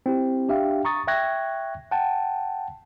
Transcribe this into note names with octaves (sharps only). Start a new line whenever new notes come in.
C4 E4 G4
D4 G4 E5 F5 G5
A#5 C#6 D#6 A6
E5 G5 C#6 F#6 G#6 A#6
F#5 G5 A5